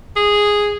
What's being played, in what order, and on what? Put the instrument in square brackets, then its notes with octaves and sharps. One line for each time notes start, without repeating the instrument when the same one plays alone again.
[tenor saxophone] G#4